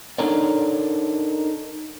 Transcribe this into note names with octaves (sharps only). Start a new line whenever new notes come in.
D4 D#4 A4 A#4 C#5 D5